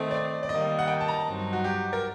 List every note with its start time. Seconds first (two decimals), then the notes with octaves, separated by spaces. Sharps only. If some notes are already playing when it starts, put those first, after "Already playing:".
Already playing: D#3 A3 C4 D#5
0.11 D5
0.43 D5
0.49 D#3 G3 A#3 D#5
0.79 F#5
0.88 G5
1.01 A5
1.08 A#5
1.13 A5
1.26 G2 F#3 C4 D#4
1.53 F#4
1.64 G4
1.93 A#4